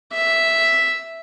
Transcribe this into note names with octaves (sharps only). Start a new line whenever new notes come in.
E5